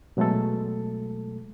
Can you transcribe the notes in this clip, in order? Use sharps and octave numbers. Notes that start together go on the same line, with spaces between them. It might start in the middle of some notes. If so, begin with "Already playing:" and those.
B2 F#3 G#3 A3 A4